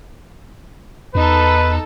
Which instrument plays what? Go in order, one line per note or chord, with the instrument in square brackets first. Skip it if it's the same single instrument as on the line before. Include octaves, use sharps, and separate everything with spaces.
[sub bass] E2 [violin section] D#4 A4 [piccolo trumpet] B4